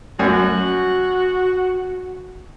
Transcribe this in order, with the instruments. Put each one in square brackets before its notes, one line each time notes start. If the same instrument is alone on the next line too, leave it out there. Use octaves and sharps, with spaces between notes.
[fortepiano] F#2 [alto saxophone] F#4